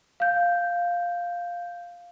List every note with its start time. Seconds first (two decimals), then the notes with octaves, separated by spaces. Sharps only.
0.20 F5 G6